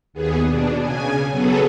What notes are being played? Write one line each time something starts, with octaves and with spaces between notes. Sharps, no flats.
D#2 B3 G#4
B2 D4
C#3 G#5
F#3 B3 G#4 A4